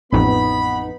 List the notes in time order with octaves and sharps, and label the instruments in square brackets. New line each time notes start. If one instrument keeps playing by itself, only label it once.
[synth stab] A1 F2 [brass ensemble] B3 [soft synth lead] D#4 [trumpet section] B5